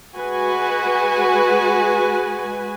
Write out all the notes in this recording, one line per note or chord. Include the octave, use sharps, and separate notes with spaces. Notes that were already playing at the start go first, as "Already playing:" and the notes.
G#3 F#4 B4 G#5